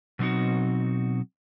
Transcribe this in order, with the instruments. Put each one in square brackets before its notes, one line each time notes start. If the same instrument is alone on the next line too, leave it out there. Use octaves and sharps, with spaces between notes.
[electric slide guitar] B2 F#3 C4 D#4 F#4